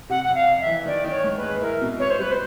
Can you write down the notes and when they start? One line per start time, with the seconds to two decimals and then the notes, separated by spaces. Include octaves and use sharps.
0.10 C3 F#5
0.24 F2 F#5
0.35 F5
0.47 F2
0.61 E5
0.66 E3
0.86 D#3 D5
1.04 D#3
1.11 C#5
1.24 G#2
1.37 B4
1.43 G#3
1.61 E4 A#4
1.81 B2
1.99 B3 C#5
2.11 C5
2.19 G3 B4
2.31 C5